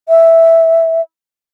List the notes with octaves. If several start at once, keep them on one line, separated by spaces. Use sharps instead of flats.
E5